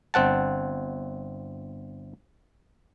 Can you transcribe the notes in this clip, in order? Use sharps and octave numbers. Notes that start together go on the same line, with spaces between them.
G1 C4 F#5 A5